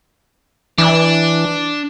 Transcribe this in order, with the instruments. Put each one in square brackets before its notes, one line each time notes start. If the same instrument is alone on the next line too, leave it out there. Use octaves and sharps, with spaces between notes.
[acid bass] E3 [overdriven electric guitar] D4